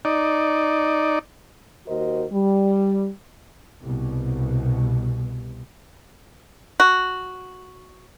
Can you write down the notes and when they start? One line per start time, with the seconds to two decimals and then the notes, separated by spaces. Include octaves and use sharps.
0.05 D#4 D5
1.88 D#2 F#4 A#4 C5 D#5
2.32 G3
3.81 C2 B2
6.80 F#4